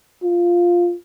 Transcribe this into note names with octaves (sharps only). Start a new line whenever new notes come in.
F4